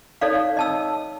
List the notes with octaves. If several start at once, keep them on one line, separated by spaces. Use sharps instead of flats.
D#4 A4 C#5 D5 F5
D#5 A5 E6